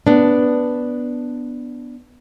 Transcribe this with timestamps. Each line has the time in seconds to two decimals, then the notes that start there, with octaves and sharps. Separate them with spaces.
0.07 B3 D4